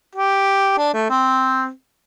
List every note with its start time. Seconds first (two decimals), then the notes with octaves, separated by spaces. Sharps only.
0.15 G4
0.78 D4
0.94 A3
1.10 C4